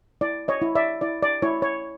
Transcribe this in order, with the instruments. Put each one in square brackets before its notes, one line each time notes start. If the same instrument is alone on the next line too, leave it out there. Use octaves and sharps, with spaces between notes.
[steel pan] E4 D5
C#5 D#5
E4
D5 E5
E4 D5
D5
E4 C#5
C#5